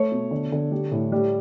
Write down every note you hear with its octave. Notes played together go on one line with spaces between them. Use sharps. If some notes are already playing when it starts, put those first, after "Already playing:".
Already playing: A3 C#5
B2
D3
D3
G3
A2
G3